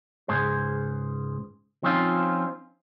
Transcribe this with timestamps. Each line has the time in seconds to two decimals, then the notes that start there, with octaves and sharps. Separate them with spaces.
0.28 C#2 G#2 G#4 C5
1.83 F3 C4 C#4 D#4 F4